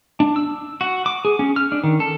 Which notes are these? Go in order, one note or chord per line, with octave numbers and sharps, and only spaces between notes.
D4
E6
F#4
D6
G#4
C#4
F6
D4
D#3
A4